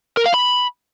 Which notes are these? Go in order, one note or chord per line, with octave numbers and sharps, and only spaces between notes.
A#4
F5
B5